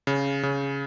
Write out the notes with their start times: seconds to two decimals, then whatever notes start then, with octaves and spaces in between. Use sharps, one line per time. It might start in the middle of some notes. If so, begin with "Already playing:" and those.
0.07 C#3
0.43 C#3